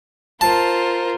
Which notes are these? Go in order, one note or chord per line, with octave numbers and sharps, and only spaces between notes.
F4 A#4 C5 A5